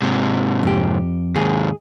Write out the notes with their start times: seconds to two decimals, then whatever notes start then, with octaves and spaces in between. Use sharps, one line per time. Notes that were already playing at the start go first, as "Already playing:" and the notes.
0.02 G#2 C3
0.63 F2 G4
1.36 D#2 G#2 G#4